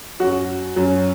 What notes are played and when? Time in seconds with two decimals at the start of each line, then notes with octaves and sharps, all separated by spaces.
0.19 F#2 F#3 F#4
0.76 F#2 F#3